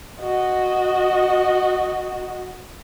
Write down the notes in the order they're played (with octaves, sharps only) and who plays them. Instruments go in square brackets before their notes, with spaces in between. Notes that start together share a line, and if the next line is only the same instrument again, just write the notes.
[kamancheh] F#4 D#5